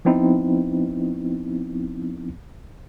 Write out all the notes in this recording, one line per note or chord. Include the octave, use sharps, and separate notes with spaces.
F3 B3 C4 D#4 E4